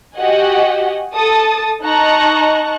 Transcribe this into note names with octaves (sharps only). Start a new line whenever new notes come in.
F#4 G4 D#5 F#5 G#5
A4 A5 D#6 A6
D#4 D#5 A5 A#5 C#6 F#6